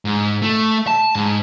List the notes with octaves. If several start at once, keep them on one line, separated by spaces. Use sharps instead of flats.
G#2
A3
A5
G#2